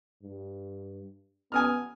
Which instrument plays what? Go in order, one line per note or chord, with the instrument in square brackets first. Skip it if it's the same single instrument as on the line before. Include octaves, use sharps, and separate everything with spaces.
[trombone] G2
[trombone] B3 [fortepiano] G#5 D#6 F6